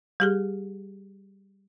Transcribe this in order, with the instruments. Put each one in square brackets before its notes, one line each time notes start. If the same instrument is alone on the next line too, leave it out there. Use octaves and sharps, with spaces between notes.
[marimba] G3 G4 G#4